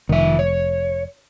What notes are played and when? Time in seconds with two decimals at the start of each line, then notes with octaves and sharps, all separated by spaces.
0.09 F1 D#3 E5
0.39 C#5